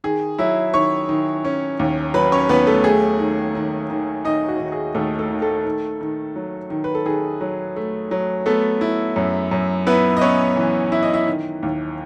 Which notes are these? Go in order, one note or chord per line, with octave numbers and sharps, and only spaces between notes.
D#3 G#4
F#3 E4 E5
D#3 C#5 C#6
D#3
C#4
D#2
F#3 B4 B5
C#4 C#5
D#2 B3 B4
A3 A4
A3 G#4
D#3
D#3
D#3
D#3 D#4 D#5
F#4
D#3
G#4
D#2 A3 A4
A3 A4
D#3
A3 A4
D#3
D#3
F#3
D#3
B4
A4
D#3 G#4
F#3
A3
F#3
A3 B3 A4
E4
F#2
F#2
B3 E4 B4
D#5
B3 C#4 C#5
E3
E4 E5
D#5
E4 E5
D#3
D#2